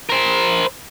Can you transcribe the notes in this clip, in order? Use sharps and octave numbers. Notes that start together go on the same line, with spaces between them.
A#4 C5